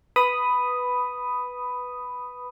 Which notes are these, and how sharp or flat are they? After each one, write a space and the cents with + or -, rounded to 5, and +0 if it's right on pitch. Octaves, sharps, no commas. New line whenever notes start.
B4 +0 B5 +5 D#6 +0